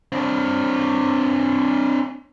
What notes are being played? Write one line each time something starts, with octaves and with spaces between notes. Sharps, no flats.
C4 D4